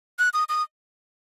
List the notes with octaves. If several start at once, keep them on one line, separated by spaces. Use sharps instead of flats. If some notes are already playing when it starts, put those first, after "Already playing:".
F#6
D#6
D#6